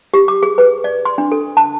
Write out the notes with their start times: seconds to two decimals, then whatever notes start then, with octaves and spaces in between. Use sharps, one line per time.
0.14 G4
0.28 D6
0.43 G#4
0.58 B4
0.84 D5
1.05 C6
1.18 D4
1.32 A4
1.57 A5